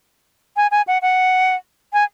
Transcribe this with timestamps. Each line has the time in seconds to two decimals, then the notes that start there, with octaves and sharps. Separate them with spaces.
0.56 G#5
0.71 G#5
0.87 F#5
1.02 F#5
1.93 G#5